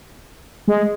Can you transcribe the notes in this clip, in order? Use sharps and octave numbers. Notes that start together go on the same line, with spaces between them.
G#3